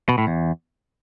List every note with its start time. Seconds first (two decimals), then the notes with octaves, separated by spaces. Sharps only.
0.09 B2
0.18 A2
0.27 E2